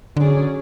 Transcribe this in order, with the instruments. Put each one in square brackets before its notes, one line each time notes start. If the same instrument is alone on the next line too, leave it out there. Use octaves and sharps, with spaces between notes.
[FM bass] D3 [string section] F#3 C#4 G#4 D5